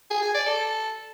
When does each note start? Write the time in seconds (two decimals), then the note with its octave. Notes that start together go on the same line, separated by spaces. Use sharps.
0.10 G#4
0.22 G#5
0.34 D5
0.46 A4